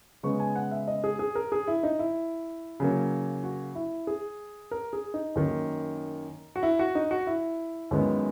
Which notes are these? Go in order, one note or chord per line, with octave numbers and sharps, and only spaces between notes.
C#3 G#3 B3 C#6
G#5
F#5
E5
D#5
G#4
G#4
A#4
G#4
E4
D#4
E4
C#3 F#3 A#3
F#4
E4
G#4
A#4
G#4
D#4
F#2 D#3 A#3
F#4
E4
F#4
D#4
F#4
E4
F#2 D#3 G#3 B3